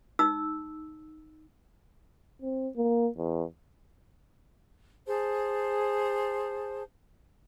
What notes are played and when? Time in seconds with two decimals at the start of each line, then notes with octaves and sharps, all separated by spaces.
0.19 D#4 E6
2.42 C4
2.76 A#3
3.17 E2
5.07 G#4 C5 A5